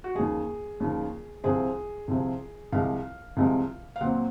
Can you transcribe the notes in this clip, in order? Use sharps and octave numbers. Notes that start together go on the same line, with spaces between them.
F#4
D#2 C#3 F3 G#4
D#2 C#3 F3
C2 C3 F3 C4 G#4
C2 C3 F3 C4
C2 C3 F3 G#3 F5
C2 C3 F3 G#3
F5
A#2 F#3 C4 F#5